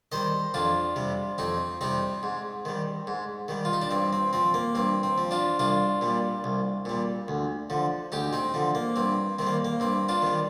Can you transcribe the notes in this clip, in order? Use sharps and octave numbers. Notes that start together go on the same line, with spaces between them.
D#3 G3 C5 D#5
F2 D4 F4
C3 G3
F2 C4 D#4
C3 G3 C4 D#4
G#2
D#3 G3
G#2
D#3 G3
F4
D#4
D4
G2 C4
C4
F3 C4
A#3
G2 C4
C4
F3
D4 F4
C2 D4 F4
A#2 G3
C2
A#2 G3
D2
D3 F3
D2 D#4 G4
C4 D#4
D3 F3
A#3
G2 C4
D#3 G3 C4
A#3
A#3
G2 C4
D4 F4
D#3 G3